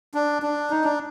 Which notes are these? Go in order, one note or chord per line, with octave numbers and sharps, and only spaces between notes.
D4
D4
D#4
D4